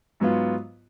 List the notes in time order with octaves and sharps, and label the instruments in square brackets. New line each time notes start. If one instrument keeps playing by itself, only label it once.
[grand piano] G#2 F#3 B3 F4